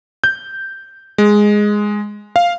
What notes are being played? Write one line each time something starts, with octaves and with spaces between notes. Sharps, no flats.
G6
G#3
F5